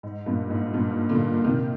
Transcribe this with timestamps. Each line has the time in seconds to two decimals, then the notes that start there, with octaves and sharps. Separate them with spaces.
0.03 G#2
0.26 G2 A#2
0.50 G#2
0.74 G2 A#2
1.09 A#2 D3
1.44 C3 D#3